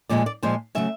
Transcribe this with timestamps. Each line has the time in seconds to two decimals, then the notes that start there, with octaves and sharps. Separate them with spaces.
0.09 A#2 F3 G#3 D5
0.26 D5
0.43 A#2 F3 G#3 C5
0.75 C#3 F#3 A3 E5